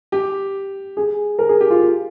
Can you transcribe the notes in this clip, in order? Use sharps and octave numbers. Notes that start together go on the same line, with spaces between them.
G4
G#4
A#4
G#4
G4
F4